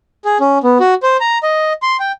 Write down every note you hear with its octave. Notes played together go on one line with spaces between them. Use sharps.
G#4
C#4
B3
F#4
C5
A#5
D#5
C6
G5